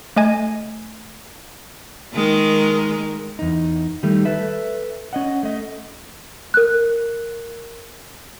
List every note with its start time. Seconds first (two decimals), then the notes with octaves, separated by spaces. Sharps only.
0.16 A3 D#5 G#5 G#6
2.14 D#3 G#3 A#4
3.39 E2 D#4
4.03 D#3 G3 A3
4.25 A4 B4 E5
5.13 C#4 D#5 F#5
5.43 A3 D#5
6.54 A#4 F#6